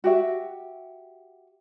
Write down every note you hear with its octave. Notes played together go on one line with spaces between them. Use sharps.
F#4 G4 E5